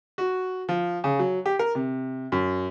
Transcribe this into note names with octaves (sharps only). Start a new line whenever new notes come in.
F#4
F3
C#3
F#3
G4
A#4
C3
F#2